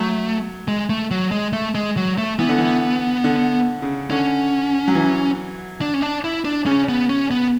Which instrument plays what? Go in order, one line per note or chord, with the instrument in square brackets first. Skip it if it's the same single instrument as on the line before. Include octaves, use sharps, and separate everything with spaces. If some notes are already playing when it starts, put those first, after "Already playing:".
Already playing: [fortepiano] F#3 [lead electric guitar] A3
[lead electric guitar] G#3
A3
F#3
G#3
A3
G#3
F#3
A3
[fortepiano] E3 [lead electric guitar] B3
[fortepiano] D3
E3
D3
C#3
[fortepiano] D3 [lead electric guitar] C#4
[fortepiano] F#3
E3
[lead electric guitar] D4
C#4
D4
E4
D4
[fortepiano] C#3 [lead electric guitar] C#4
[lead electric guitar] B3
C#4
B3